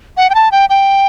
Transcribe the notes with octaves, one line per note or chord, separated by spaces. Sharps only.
F#5
G5
A5
G5
G5